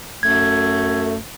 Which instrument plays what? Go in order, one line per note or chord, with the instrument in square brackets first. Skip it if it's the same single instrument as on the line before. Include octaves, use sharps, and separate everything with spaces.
[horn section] F#2 A3 [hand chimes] G#6